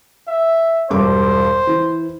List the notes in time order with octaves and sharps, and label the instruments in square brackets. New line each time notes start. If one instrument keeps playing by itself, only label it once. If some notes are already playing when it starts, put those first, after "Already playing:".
[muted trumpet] E5
[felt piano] E1 G2 D6 [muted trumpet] C5
[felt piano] E3